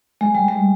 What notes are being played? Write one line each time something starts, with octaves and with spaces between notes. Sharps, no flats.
G#3
G3
G#3